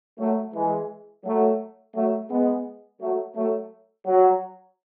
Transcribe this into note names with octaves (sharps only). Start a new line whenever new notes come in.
F#3 A3
E3 G#3
F#3 A3
F#3 A3
G#3 B3
F#3 A3
F#3 A3
F#3